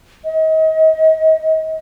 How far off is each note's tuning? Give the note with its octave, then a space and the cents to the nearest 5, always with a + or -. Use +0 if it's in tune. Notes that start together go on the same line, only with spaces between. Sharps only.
D#5 +35